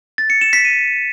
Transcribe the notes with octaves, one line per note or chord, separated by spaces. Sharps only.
A6
C#7
E7
B6
D#7